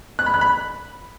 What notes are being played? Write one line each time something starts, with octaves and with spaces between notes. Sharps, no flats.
F#6
B5
F#6
B5